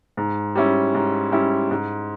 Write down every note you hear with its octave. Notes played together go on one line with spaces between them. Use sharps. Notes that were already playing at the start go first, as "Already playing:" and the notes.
G#2
G3 C#4 E4
G#2
G3 C#4 E4
G#2